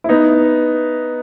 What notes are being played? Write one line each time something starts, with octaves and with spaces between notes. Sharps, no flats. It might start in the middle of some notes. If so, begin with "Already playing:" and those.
E4
B3 D#4